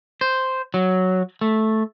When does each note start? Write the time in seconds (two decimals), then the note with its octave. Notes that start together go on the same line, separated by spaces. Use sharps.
0.21 C5
0.74 F#3
1.41 A3